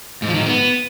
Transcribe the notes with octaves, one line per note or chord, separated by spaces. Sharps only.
G#2
F3
D#3
G#2
B3